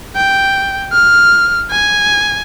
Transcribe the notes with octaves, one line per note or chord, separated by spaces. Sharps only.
G5
F6
G#5